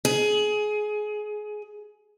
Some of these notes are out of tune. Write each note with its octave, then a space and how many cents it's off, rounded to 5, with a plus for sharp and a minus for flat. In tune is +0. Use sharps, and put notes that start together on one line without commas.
G#4 +20